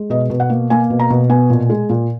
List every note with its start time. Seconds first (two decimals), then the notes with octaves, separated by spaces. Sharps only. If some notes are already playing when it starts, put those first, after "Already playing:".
Already playing: G#3
0.10 B2 D#5
0.30 B2
0.40 F#5
0.50 A#3
0.70 A#3 G#5
0.90 B2
0.99 A#5
1.10 B2
1.29 B3 G#5
1.50 A#2
1.70 G#3
1.89 A#2